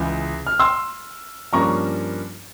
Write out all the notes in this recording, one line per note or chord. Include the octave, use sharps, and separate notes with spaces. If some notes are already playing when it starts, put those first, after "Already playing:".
Already playing: C#2 C#3 E3 G#3
F6
C6 E6
G2 F3 A#3 C#4 A#5 C#6